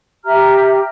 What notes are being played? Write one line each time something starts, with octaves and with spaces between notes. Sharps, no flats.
G4 E5 A#5 F6